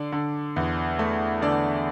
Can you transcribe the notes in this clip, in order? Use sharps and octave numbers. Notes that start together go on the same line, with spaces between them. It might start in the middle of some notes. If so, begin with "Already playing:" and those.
Already playing: D3 D5
D3
E2
A3
D3 D5